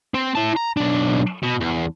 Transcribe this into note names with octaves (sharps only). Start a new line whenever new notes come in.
C4
E4 A5
A#5
B1 D4
B2
E2